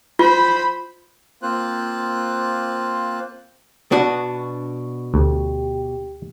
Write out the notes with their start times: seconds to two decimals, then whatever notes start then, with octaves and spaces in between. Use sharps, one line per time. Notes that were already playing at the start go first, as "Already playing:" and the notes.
0.19 F4 C5 B5
1.42 A#3 C4 F4 C5 F#6
3.92 B2 D4 F#4
5.14 D2 G4